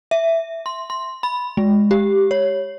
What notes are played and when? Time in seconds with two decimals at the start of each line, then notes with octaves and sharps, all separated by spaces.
0.11 E5
0.66 C6
0.90 C6
1.23 B5
1.57 G#3
1.91 G4
2.31 C#5